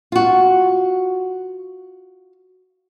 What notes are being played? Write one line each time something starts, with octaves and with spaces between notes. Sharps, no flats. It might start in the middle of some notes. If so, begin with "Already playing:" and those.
F4 F#4